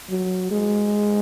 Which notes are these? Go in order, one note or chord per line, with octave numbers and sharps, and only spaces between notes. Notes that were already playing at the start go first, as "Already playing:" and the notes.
F#3
G#3